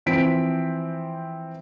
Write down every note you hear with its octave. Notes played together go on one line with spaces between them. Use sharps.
E3 F3 C4 B6 D7